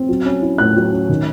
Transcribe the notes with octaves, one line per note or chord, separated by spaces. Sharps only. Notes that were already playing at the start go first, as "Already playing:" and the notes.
Already playing: C4
F#3
C#4
E4
A2 F#6
F#3
C#4
D#3